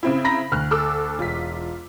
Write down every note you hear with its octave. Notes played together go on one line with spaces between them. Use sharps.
C#3 C4 E4
A#5 B5 A#6
D2 F6 F#6
A4 D6 E6
E1 F4 B6